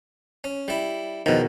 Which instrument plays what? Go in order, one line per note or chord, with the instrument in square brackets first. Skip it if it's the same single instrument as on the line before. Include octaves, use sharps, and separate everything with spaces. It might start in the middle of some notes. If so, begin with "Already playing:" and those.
[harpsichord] C#4
G3 E4
[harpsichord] E2 F3 [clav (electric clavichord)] B2 D#3